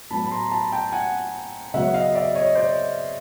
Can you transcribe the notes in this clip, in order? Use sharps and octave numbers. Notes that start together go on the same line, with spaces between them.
A2 F#3 B3 A5 B5
B5
A#5 C6
A5 B5
G5 A5
F#5 G#5
C#3 F#3 B3 E5 F#5
D#5 F5
D5 E5
C#5 D#5
C5 D5